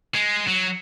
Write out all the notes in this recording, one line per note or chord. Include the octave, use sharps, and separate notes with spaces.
G#3
F#3